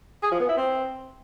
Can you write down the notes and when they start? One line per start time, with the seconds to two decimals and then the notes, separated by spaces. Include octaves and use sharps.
0.23 G#4
0.31 F3
0.40 B3
0.49 E4
0.57 C4